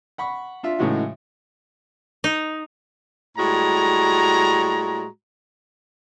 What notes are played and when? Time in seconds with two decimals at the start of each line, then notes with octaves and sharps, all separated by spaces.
0.18 F#5 B5 C#6
0.63 D4 F4 E5
0.79 A2 C#3 E3 G#3 D#4 F#4
2.24 D#4
3.38 A2 G3 G#3 F#4 A#5